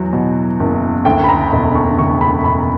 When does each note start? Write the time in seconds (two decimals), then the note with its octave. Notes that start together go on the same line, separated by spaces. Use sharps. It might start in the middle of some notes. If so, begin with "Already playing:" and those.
Already playing: E2 F#3
0.13 B2
0.60 F#1
1.05 D2 G5
1.24 B5
1.29 A#5
1.52 E1 B5
1.75 C#6
1.99 C#3 C#6
2.21 B5
2.44 E1 B5
2.59 A#5